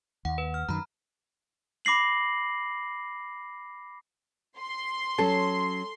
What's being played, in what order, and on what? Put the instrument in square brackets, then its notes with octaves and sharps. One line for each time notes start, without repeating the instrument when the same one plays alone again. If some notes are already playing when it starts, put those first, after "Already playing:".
[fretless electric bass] D#2 [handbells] F#5
[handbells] B4
F6
[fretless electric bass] F#2 D#3 [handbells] A#5 B5
[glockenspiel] B5 D6 A#6 C7 F#7
[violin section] C6
[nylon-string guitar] F#3 C#4 [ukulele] A4